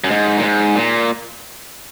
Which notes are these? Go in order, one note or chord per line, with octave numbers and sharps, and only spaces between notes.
F#2
G#2
A#2
G#2
A#2